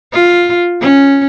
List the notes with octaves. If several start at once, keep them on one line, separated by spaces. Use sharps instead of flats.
F4
C#4